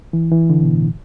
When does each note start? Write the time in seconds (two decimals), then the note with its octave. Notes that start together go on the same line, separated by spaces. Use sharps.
0.13 E3
0.31 E3
0.50 D3
0.63 B2
0.75 A2